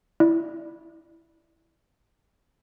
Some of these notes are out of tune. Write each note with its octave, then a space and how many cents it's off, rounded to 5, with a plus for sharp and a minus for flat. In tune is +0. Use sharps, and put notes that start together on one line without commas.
E4 +0 D5 +20